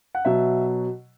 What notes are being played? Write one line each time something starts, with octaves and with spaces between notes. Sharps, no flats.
F#5
B2 F#3 E5